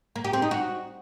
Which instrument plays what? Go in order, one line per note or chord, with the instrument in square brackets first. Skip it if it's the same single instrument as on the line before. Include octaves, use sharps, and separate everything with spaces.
[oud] A#3
G4
C4
D#4
F#4